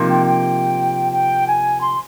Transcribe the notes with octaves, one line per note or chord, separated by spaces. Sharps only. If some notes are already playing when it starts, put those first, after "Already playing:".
Already playing: C3 F3 A#3 D#4
G5
G5
G5
G#5
C6